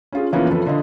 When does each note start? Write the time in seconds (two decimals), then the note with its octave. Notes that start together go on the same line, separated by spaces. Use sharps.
0.12 C#4 F4 G#4
0.33 E3 F3 A#3 B3 C#4 E4
0.50 F2 A4 B4
0.66 D3 F4 D#5